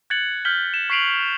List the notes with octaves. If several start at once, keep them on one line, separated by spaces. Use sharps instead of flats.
F#6 G#6 A6 C#7 F#7
F6 G6 B6 F#7 G7
E7
C#6 B6 C7 D7 F7 F#7